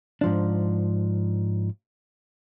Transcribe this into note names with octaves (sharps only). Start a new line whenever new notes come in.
G#2 F3 D4